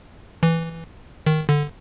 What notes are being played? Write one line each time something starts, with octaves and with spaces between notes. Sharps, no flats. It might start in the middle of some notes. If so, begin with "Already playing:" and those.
E3
D#3
D3